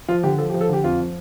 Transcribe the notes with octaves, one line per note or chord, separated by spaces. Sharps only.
F3 F4
D3 G4
F3 A4
G4
F3
A4
D3 G4
F2 F4
F3